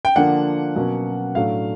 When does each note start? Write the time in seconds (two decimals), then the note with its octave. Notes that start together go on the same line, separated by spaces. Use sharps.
0.05 G5
0.15 D3 F3 A#3 D4 F#5
0.76 B2 F#3 A#3 C#4
1.35 A2 F#3 A3 D4 F5